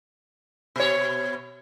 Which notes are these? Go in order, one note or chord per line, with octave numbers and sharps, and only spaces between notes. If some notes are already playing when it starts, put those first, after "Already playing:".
B2 C#5